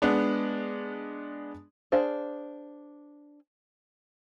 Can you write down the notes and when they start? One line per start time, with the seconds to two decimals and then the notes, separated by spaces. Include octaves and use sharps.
0.02 G#3 B3 D4
1.92 D4 G#4 C5 F5